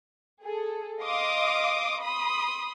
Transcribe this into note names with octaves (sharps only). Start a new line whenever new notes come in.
G#4 A4
D#5 F5 C6 D6 D#6
B5 C6 D#6